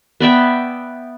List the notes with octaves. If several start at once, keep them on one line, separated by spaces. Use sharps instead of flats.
B3 D5 E5 G5